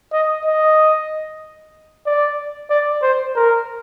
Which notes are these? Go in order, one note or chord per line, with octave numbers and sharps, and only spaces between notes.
D#5
D#5
D5
D5
C5
A#4